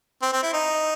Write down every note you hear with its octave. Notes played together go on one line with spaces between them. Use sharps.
C4
C4
E4
D#4